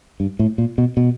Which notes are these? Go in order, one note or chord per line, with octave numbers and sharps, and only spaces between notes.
G2
A2
A#2
B2
B2